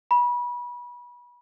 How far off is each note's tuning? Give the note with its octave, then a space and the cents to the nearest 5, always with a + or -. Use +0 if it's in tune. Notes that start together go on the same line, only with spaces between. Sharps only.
B5 -30